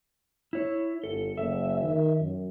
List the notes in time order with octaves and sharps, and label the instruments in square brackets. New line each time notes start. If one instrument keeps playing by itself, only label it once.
[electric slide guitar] E4 C#5
[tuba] G1 [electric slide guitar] A4
[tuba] F#1 [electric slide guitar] E5
[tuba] D#3
F#2